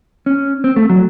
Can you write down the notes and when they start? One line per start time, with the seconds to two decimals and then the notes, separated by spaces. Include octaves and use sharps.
0.26 C#4
0.64 C4
0.76 A3
0.89 F#3